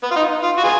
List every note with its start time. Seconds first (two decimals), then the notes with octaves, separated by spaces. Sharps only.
0.03 B3
0.11 F4
0.16 D#4
0.43 F4
0.58 F#4
0.64 B3 F4 G#4